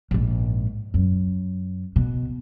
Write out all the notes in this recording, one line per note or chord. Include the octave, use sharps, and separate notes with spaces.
A#1 G#2
F#2
B2